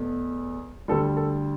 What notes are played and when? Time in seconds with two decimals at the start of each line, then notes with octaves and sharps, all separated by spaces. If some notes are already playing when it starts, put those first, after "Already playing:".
Already playing: E2 B2 A3
0.88 D2 D3 G3 A4
1.17 A4